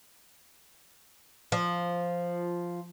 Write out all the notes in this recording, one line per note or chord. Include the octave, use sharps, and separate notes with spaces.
F3